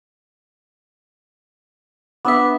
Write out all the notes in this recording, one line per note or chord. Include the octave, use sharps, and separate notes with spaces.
B3 D4 B4 E5 E6